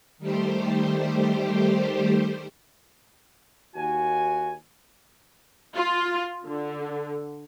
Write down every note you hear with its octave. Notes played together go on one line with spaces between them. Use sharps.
D#3 G3 A3 G4 C5
D#2 F#4 G#5
F4
D3